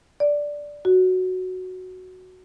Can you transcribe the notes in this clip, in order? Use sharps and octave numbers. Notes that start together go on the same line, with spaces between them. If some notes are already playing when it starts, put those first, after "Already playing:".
D5
F#4